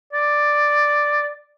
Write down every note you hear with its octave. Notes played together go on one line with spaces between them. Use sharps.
D5